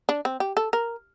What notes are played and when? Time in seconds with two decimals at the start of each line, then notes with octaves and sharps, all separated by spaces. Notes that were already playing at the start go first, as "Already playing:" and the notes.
0.09 D4
0.25 C4
0.40 G4
0.57 A4
0.73 A#4